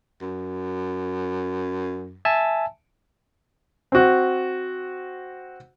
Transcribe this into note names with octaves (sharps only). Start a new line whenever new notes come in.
F#2
E5 G#5 A5
C4 F#4